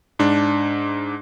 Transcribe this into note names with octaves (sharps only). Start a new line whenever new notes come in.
G#2 D4